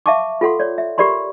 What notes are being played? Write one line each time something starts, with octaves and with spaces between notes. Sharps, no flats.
E5 F5 A5 C#6 D6
F4 A4 F#5 C6
C#5 D5
E5
G4 A#4 D5 B5 C6